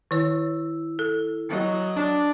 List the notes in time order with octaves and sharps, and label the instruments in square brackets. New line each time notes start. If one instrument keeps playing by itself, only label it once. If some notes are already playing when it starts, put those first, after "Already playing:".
[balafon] D#3 C#5 [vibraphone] E4
[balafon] A4
[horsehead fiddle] F#3 D#5
[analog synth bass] D4